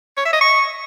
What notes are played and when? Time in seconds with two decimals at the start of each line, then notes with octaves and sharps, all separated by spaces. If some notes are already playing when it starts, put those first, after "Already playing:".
0.17 C#5
0.25 E5
0.33 D#5
0.41 C#6